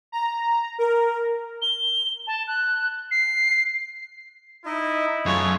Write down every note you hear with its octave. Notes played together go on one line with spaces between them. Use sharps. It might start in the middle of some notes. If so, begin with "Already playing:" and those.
A#5
A#4
G7
A5
F#6
C7
D#4 E4 D#5
F#2 A3 F4 G#4 C#5